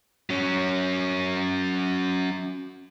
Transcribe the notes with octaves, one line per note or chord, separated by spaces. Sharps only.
F#3 C#4